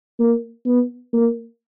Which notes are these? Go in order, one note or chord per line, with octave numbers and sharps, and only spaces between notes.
A#3
B3
A#3